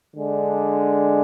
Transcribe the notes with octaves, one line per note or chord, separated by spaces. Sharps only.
D3 G#3 D4